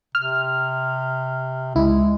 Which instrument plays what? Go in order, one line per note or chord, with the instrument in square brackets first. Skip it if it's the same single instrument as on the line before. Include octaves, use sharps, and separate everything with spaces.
[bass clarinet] C3 [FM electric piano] F6
[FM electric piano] C#2 E4 [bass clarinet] G#3